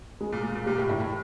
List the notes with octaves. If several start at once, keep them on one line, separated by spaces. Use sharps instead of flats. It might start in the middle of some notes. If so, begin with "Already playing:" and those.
G#3
A#2
A#2 G#4
A#2
A#2 G4
A2
A2 E4
A2